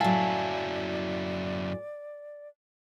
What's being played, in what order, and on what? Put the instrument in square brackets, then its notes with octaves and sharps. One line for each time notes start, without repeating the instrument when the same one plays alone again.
[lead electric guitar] F#2 E4 [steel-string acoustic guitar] A2 F#3 [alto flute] D5 [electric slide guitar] F5 G#5 A5